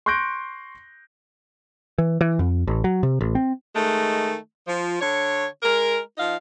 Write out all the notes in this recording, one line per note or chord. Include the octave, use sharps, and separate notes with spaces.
C6 C#6 F#6 G6 A#6 D7
E3
E3
F2
A1
F#3
C3
A1
C4
D#3 G#3 A3
F3
D3 C#5
G#3 A#4
F3 D#4 F5